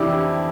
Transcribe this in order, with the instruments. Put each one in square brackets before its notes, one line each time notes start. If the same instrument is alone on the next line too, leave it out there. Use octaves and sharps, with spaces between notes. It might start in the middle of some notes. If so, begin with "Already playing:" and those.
Already playing: [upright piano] F2 C3 E3 D4 E4 G4